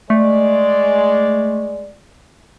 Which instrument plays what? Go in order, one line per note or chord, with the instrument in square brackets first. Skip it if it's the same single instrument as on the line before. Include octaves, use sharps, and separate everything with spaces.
[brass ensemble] G#3 D5 [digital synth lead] A3